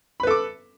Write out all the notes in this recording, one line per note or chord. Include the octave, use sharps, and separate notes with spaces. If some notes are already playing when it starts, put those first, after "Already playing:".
A4 B4 B5 D6